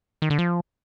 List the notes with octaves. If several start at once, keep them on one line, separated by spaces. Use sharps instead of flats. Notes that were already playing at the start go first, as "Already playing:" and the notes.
D#3
D3
F3